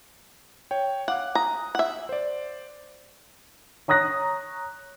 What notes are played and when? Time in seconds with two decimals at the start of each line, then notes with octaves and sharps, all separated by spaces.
0.71 C#5 G5
1.08 F5 F#5 D6 F#6
1.35 A#5 D#6
1.75 E5 F#5
2.09 C5 D5
3.88 C#5 A#5 D#6 F#6 A#6